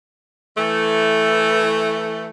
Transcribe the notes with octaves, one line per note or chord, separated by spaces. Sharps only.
E3 A3